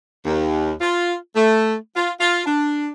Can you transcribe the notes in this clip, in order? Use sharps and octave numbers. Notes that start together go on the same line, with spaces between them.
D#2
F4
A3
F4
F4
D4